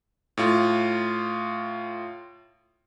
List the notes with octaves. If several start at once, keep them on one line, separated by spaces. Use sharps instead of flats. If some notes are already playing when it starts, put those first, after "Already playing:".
A2 F4